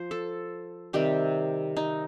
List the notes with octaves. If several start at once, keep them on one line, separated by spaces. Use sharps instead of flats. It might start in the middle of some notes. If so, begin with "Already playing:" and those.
Already playing: F3 C5
A4
C3 D#3 G3 G4
D#4